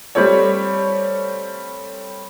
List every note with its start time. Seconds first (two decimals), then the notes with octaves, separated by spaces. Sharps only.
0.15 G3 A3 C4 G4 A4 C#5